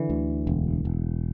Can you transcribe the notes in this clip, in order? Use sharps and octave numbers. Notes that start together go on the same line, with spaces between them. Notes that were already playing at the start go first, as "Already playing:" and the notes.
Already playing: D3 E3
D2
E1
E1